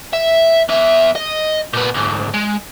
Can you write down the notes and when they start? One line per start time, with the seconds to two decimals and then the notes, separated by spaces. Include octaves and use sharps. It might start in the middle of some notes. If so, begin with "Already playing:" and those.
0.13 E5
0.69 E2 E5
1.16 D#5
1.73 A#2 B3
1.94 D2 G#2
2.34 G#3